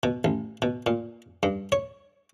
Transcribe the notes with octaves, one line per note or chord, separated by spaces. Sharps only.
B2
A1
B2
A#2
G2
C#5